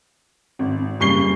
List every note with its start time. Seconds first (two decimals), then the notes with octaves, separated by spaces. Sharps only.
0.59 G#1
1.00 F#1 G3 C#6 C7 G7